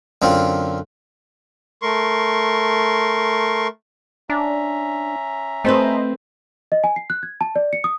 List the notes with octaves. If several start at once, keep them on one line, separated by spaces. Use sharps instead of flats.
F#2 D3 C4 F4
A3 A#4 C6 C#6
C#4 D4 E5 A#5
A3 C4 A4 B4 C5 D#5
D#5
G#5
C7
F#6
G#6
A5
D5
C#7
D#6